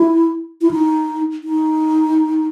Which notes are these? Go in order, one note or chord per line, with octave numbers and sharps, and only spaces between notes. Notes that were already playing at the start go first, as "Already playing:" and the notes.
Already playing: E4
E4
D#4
D#4